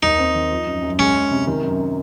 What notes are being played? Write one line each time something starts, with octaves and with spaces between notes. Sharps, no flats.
D#2 D#4
C4
D#3
F3
F#2
F#2
G#3 C#4
G#3
C3
D#3
F#2